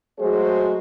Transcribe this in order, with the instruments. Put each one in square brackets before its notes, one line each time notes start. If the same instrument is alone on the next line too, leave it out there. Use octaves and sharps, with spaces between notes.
[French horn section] F#3 G#3 A3 F#4 G#4 C5